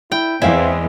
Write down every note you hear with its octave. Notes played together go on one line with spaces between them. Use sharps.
E4 G5
E2 G#3 C4 E4 E5 F5